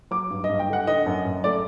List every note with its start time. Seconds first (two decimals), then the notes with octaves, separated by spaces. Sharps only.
0.11 F#3 D6
0.30 G2
0.44 D#5
0.49 G2
0.59 G5
0.69 D3 F#5
0.87 D3 D#5
1.06 F#2
1.25 F#2
1.44 A3 D5